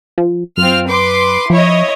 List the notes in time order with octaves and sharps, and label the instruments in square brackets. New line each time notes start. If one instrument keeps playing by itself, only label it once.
[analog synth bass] F3
[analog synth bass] F#2 [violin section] C4 F4 F6
[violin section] B4 C6 D6
[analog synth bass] F3 [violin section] E4 C#5 D#5